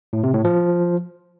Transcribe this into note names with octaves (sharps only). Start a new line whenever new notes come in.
A2
C3
A2
F3